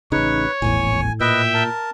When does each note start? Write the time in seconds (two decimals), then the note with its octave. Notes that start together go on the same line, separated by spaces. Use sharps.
0.12 A1 C#3 D#4 B4 C#5
0.62 D#1 G#1 E2 A2 G#5
1.20 A#2 B4 D#5 E5 G5
1.54 A#4 A5